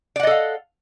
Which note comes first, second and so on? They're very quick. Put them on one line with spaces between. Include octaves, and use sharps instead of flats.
D5 F#5 D#5 A4 F5